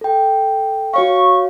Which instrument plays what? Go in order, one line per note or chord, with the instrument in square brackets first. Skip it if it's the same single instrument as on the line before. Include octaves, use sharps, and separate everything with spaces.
[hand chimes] A4 G5
[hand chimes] F#4 C#5 F5 [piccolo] C#6